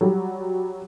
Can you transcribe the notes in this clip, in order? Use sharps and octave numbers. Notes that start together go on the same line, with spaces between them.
F#3 G3